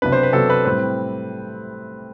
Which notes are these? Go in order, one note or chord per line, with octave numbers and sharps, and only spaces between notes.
C3 F#3 B3 D4 B4
C5
B4
C3 F#3 B3 D4 A4
B4
A2 G3 C4 B4